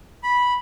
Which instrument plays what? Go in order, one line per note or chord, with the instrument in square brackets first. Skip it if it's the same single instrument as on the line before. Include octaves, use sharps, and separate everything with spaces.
[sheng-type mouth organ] B5